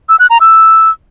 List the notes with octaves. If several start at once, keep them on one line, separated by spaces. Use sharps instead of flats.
E6
F#6
A#5
E6